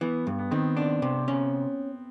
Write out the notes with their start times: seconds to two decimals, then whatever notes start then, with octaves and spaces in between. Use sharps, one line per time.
0.01 E3 B3
0.27 G2 B3
0.39 B3
0.51 D#3 C4
0.77 D4
1.02 C3
1.28 C#4